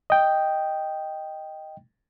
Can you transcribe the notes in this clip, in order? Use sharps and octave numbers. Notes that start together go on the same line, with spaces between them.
D#5 G5